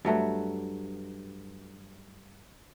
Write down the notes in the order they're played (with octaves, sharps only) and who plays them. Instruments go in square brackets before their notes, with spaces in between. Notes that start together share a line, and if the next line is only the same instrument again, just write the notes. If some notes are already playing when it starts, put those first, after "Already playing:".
[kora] G2 F#3 A3 B4